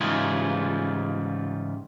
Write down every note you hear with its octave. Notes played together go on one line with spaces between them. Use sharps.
G#2 C#3 E3 G3 F4 G#4